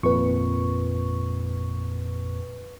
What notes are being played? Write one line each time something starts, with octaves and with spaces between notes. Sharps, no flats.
G#1 F2 A#2 B4 C#6